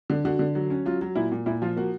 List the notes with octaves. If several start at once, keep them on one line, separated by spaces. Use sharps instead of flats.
D3
D3 F#4
D3
F#3
C#4
F#3 F4
F#3
A#2 E4
A#2
A#2 E4
F3 F4
A#3 F#4